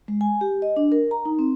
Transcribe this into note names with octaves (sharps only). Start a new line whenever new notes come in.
G#3
G#5
G4
D#5
D4
A#4
A#5
D#4
C4